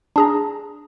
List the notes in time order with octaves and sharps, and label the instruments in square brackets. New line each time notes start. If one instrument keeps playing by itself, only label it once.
[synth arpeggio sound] D4 G#4 A#5